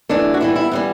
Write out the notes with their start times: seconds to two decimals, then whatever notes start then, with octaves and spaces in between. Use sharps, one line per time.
0.09 E3 A3 D4
0.34 F#4
0.41 E3 G3 B3 E4
0.56 E4
0.71 E3 G3 B3